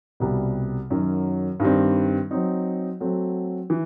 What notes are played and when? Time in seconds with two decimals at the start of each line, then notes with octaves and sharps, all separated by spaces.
0.20 C2 B2 G3
0.90 F#2 D#3 F#3
1.60 G2 D#3 G3 C4
2.31 F#3 C4 D#4
3.00 F#3 A3 C4 F#4
3.70 E3